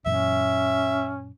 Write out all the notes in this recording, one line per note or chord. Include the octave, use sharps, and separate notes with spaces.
F#2 A#2 E3 C#4 E5